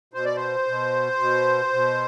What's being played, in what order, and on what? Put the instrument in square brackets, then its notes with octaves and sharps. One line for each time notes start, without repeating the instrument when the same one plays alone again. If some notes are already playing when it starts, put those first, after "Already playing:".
[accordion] B2 C5
D5
C5
B2
B2
B2